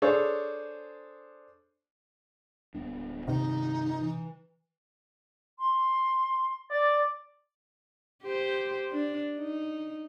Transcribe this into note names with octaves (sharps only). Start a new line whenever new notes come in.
D4 G#4 A4 C5 C#5
D1 B3 D4
G2 C3 D#3 D#4
E3
C6
D5 A6
G4 C5
D4
D#4